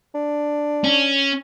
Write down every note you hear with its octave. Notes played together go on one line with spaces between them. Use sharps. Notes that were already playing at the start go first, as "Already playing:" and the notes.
D4
C#4